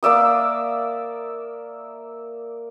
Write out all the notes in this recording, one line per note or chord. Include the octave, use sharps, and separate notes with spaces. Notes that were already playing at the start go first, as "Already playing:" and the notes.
A#3 D5 E5 D#6